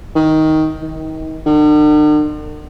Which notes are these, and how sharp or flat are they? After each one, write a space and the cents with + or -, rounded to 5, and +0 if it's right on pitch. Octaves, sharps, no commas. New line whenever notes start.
D#3 +10
D#3 +30
D3 +45